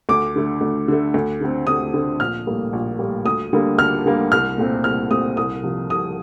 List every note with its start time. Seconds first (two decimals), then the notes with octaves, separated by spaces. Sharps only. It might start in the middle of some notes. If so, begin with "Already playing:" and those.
0.09 D2 D6
0.36 D3 A3
0.61 D2
0.88 D3 A3
1.14 D2
1.41 D3 A3 C4
1.67 D2 D#6
1.94 D3 A3 C4
2.19 A#1 F6
2.47 A2 G3 A#3
2.73 A#1
2.99 A2 G3 A#3
3.25 D2 D#6
3.53 D3 G3 A#3
3.78 D2 F6
4.06 D3 G3 A#3
4.32 C2 F6
4.58 A#2 A3 C4
4.84 C2 F6
5.10 A#2 A3 C4 D#6
5.37 C2 D#6
5.63 C3 F3 A#3
5.90 C2 D#6